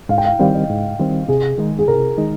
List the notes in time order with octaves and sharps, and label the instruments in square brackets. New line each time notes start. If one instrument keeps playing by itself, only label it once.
[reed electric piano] G#2 [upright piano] F5
[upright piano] G5
F5
[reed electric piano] D#3 G3 C4 [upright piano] F5
[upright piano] D#5
[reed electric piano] G#2
D#3 G3 C4
[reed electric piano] C3 [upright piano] G#4
[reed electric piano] D#3 G#3 D#4
[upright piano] G#4
[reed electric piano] C3 [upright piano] A#4
[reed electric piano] D#3 G#3 D#4